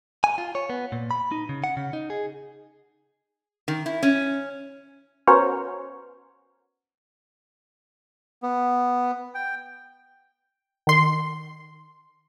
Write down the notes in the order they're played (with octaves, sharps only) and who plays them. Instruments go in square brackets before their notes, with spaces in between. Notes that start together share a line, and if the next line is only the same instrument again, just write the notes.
[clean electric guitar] G#5
F4
C#5
B3
A#2
B5
D#4
C#3
F#5
C#3
D#4
G#4
[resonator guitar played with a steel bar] D#3
E4
C#4
[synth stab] B3 C#4 F#4 A#4 C5 C#5
[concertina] B3
G5
[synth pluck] D#3 C6